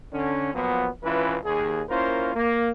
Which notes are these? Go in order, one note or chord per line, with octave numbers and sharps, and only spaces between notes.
D3 C#4
A#2 F3 F#3 B3
G#1 E3 C#4 E4 F4 B4
D#2 G#4
A#3 C#4 E4 F4 A#4 C5
A#3